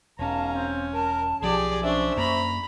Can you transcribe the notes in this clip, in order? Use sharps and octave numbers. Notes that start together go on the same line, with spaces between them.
E1 B1 C#4 F5 A5 A#5
C4
A#4 A5
B1 F3 G4 G#4 D5
C#4 D4 C5 E5
F#2 A#3 A#5 B5